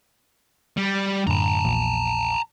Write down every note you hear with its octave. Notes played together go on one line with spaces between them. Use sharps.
G3
F#2 A2 D3 A5 A#5
A#1 E2 A#2